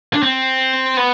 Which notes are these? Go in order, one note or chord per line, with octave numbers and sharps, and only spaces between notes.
D4
C4
B3